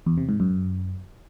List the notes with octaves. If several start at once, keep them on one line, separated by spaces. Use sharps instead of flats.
E2
C3
G#2
F#2